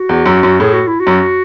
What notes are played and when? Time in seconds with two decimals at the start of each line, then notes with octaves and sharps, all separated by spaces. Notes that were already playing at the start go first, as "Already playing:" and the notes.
Already playing: F#4
0.09 E2
0.26 F#2
0.43 F#2
0.60 A2 G#4
0.73 F#4
0.88 E4
1.00 F#4
1.07 F#2